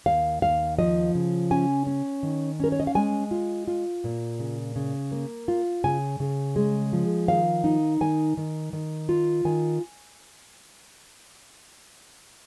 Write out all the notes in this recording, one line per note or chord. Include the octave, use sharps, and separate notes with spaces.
D#2 F5
D#2 F5
F3 D#5
C#3
C#4 G#5
C#4
D#3
C#4 A#4
C#5
D#5
F5
G#3 G#5
F4
F4
A#2
C#3
C#3
A#3
F4
C#3 G#5
C#3
G#3
F3
D#3 F5
D#4
D#3 G#5
D#3
D#3
F4
D#3 G#5